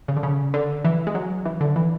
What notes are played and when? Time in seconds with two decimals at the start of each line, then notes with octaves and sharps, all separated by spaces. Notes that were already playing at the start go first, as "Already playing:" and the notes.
0.08 C#3
0.16 D3
0.23 C#3
0.54 D3
0.85 E3
1.07 G#3
1.15 F#3
1.45 E3
1.61 D3
1.76 E3